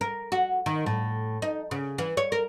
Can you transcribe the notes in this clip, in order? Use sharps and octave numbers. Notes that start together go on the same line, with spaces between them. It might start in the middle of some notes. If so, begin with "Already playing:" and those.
A#4
F#4
D#3
A2
D#4
C#3
E3
C#5
A#4